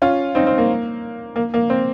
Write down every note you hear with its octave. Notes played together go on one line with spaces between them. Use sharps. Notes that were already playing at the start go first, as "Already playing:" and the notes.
C#4 F4
C4 D#4
C4
A#3
A#3
A#3
C4